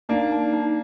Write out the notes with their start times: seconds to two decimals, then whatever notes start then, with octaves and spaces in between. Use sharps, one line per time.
0.09 A#3 D4 D#4
0.32 D#4
0.53 D#4